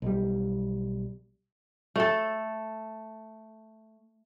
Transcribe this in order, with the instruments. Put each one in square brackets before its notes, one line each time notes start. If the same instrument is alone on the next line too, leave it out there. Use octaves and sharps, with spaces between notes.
[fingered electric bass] B1 G3
[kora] A3 A4